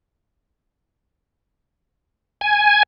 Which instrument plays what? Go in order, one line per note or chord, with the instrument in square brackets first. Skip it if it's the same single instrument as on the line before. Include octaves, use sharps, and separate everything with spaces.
[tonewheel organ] G#5